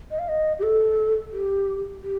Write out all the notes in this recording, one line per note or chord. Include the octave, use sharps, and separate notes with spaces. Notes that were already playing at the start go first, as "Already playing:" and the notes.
D#5
F5
D#5
G4
A4
G4
G4